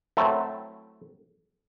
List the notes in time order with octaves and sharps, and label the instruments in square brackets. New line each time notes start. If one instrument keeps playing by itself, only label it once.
[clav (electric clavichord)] F#3 A3 C4 E4 A4